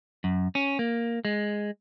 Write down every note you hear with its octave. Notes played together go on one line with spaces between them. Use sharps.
F#2
C#4
A#3
G#3